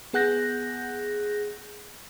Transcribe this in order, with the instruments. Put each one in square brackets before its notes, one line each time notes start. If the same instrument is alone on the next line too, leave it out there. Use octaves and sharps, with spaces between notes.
[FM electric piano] B3 G#4 F#5 F#6 G6 A#6